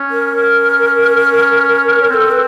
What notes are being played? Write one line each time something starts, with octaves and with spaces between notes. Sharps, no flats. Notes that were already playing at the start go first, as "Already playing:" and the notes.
Already playing: C#4
A#4
C#4
C#4
C4 A4 A#4
B4